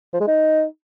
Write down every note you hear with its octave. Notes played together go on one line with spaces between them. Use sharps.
F3
G#3
D#4